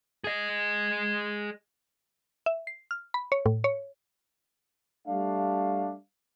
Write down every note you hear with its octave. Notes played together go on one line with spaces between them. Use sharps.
G#4 D#5
E5
C7
F6
B5
C#5
A2
C#5
G3 A3 D4 F5